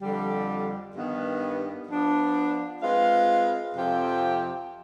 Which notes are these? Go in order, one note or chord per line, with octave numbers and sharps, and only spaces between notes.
F2 D3 G3
G2 D#3 B3
F3 B3 D4
G#3 C4 F4 B4 F5
F2 C3 F3 C4 G4